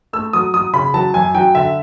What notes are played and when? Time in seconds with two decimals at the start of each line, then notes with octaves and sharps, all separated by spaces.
0.13 A3 E6
0.33 F#3 D#6
0.54 F#3 D#6
0.73 C#3 B5
0.94 F#3 A5
1.14 F#2 G#5
1.34 F#3 G5
1.55 D3 E5